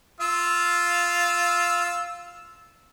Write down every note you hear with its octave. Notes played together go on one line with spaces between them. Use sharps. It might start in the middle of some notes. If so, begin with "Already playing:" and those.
F4 F5 E6